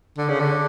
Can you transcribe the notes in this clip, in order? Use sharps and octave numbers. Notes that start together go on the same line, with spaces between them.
D3
C#3
D3